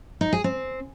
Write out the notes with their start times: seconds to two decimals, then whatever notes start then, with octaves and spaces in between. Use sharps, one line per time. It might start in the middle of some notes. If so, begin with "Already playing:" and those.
0.21 D#4
0.33 G#4
0.44 C4